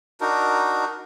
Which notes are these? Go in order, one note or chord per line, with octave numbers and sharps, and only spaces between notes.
D4 D#4 F#4 A#4